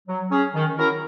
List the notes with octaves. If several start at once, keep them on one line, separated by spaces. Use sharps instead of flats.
F#3
C#4 G#4
D#3
F#3 C#4 E4 A#4